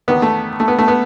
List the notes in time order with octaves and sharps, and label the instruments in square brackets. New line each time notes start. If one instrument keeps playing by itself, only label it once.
[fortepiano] E2 D#3 B3
A3
A3
B3
A3
B3